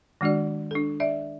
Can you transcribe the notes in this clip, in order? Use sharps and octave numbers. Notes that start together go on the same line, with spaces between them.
D#3 G#3 D4 F#4 D5
D4 A4
D5 E5